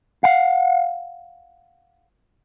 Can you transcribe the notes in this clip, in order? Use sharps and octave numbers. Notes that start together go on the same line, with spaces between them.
F5 F#5